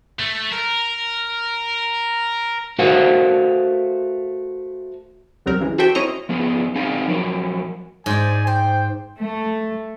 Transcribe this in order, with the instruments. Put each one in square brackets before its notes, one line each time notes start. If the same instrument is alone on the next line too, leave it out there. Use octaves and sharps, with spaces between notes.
[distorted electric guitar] A3
A#4
[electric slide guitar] A3 F#4 A#4 C5 F5 F#5
[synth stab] C2 F#2 F#3 G3 C4 A#4
C#3 E3 G#3
F#4 A4 C5 D5 E5 G5
C4 C#4 E4 D#5 A#5
[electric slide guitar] F3 B3 G#4
C4 D#4 G#4 F5 G#5
F3 F#3 A#4
[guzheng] G#2 C5 D5 [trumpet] G#5
[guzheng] C5 [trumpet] G5
[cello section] A3